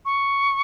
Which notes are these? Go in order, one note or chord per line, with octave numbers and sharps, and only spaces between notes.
C#6